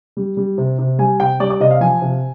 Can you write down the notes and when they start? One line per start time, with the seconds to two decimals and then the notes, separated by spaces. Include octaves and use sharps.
0.17 G3
0.37 G3
0.58 C3
0.78 C3
0.99 G3 G#5
1.20 C3 G5
1.40 G3 D5
1.50 D5
1.60 C3 D#5
1.71 F5
1.81 F3 G#5
2.02 C3